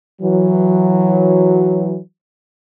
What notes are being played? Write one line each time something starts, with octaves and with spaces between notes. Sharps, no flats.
E3 F#3